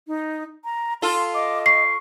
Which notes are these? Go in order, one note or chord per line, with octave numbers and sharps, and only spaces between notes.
D#4
A#5
F4 A4 C6
D#5 D6
C#6 C7